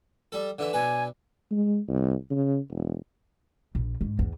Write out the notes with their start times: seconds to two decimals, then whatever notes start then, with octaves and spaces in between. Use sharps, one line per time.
0.32 G3 A4
0.59 D3 E3 E5
0.73 B1 D4 B4 G#5
1.51 G#3
1.88 C2
2.30 C#3
2.70 E1
3.75 A#1
4.01 G#2
4.19 E2